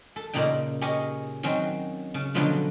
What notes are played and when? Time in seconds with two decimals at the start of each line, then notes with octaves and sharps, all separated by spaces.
0.16 A4
0.33 A#2 C#3 A#3 D#4 G5
0.81 G4 G#4 A#4 C#5 D#5 G#5
1.43 D#3 F#3 C4 C#4
2.14 C#3
2.34 B2 D3 F3 F#3 B3 F4